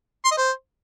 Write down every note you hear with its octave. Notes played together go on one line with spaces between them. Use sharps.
C6
D#5
C5